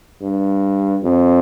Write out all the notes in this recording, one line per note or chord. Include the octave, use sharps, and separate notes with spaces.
G2
F2